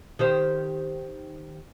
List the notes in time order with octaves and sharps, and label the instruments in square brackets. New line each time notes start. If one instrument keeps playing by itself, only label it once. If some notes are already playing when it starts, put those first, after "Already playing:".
[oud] D#3 G4 C5